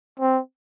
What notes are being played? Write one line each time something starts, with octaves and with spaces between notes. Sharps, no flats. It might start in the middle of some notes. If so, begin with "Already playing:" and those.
C4